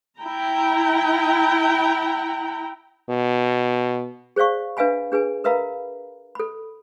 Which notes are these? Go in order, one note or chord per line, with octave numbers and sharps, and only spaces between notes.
E4 G5 A#5
B2
G#4 C5 D5 F5 C#6
D4 B4 E5 F5 G#5 B5
D4 G#4 B4 G#5
A#4 B4 E5 F5 A#5 B5
A4 B5